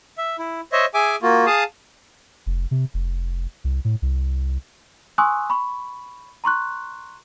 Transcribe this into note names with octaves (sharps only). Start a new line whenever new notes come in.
E5
E4
C5 C#5 D#5 E5
G#4 E5 G#5 D6
A#3 F4 F#4
G#4 F5 A5 D#6
F1
C3
F1
C2
A2
C2
G#5 C6 C#6 D#6 E6 F#6
B5 C#6
A#5 C6 C#6 F#6